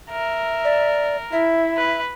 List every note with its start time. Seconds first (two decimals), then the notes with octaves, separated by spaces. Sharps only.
0.11 A#4 E5
0.65 D5
1.32 E4 E5
1.77 B4